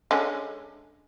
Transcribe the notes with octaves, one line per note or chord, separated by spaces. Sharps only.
D3 G#3 C#4